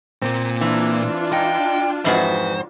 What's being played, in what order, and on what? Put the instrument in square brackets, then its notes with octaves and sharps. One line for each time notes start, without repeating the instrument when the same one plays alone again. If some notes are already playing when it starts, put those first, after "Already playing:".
[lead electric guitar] A#2 A#3 [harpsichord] C4
[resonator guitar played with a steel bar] E3 [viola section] D4 F4
[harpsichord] D#4 F5 [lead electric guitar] G5
[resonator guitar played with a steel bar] F2 G#2 F#4 [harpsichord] E3 E4 E5 [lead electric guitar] C5